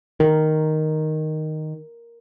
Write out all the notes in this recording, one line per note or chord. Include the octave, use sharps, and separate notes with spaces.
D#3 A#4